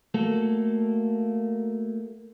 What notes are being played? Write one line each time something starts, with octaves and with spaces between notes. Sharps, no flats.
A3 A#3 F#4 A4